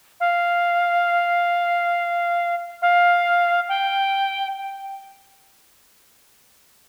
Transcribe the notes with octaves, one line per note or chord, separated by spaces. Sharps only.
F5
F5
G5